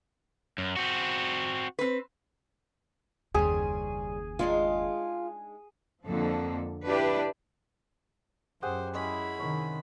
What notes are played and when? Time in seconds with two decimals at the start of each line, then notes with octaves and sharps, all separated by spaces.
0.58 F#2
0.76 C4 F#4
1.79 C4 B4
3.34 F#1 D#2 C#3 G3 C4 G#4
4.39 G#3 D4 D#4 F4
6.03 F2 D3 F3 A#3 A4
6.86 D4 E4 G4 B4 D5
8.63 F#2 G4 G#4 C5 F#5
8.94 G#3 C#4 E4 G#4 B5
9.39 C3 D#3 C#5